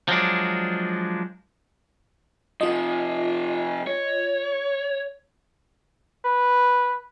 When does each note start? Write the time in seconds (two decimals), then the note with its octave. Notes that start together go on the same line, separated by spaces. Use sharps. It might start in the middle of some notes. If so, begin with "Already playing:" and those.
0.08 F3 F#3 G#3 D4
2.61 C3 F3 F4 D#5
3.87 C#5
6.25 B4